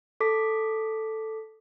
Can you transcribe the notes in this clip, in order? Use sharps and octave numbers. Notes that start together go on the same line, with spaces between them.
A4 D6 B6